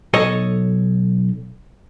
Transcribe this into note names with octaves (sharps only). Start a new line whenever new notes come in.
B1 A4 C#5 D#5